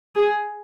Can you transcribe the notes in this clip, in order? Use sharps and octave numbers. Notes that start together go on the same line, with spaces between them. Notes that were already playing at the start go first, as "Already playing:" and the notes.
G#4